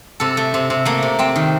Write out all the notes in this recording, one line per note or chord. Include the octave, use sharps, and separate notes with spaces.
C3 A4
A3
C3
C3
A3 A#3
C3
C3 C4
D#3